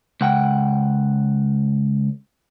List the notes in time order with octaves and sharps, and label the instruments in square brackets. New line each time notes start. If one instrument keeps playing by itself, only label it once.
[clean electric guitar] C#2 F#5 G5